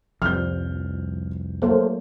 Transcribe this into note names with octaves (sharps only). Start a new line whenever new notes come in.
C2 F2 F3 G3 F6 G6
F#3 A3 A#3 A4 C5